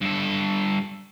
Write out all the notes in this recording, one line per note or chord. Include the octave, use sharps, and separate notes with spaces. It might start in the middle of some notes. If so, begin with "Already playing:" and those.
G2 A4